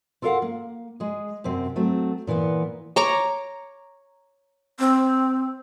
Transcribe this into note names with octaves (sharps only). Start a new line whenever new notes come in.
F4 A4 A#4 D5 F5 F#5
A#3
G#3 G#4
F#2 C3 C4
F#3 A3 C4
A#2 E3 A#3 B3
C#5 A#5 D6
C4